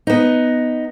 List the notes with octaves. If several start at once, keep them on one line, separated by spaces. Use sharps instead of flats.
B3 D#4